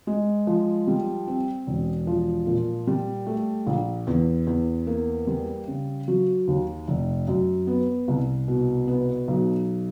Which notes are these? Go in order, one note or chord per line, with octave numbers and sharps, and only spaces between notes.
G#3
F3
G3
C4
E1
F3
A#2
G3
A3
A#1
E2
E2
A#3
G3
C#3
F#3
D#2
F1
F#2
B3
C2
B2
B3
B1